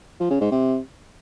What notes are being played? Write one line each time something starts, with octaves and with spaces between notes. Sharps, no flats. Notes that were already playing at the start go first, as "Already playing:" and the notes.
F3
C#3
G#2
C3